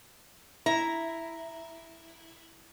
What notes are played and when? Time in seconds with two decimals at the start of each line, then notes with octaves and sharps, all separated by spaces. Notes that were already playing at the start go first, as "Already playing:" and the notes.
0.66 E4 A#5